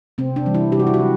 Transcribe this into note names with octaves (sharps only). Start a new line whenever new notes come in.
C3 C4
D4
E3 G3
E4
C3 G4
F#4
E4
F#4
F#3